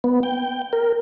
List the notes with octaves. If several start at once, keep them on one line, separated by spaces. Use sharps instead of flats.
B3
G5
A#4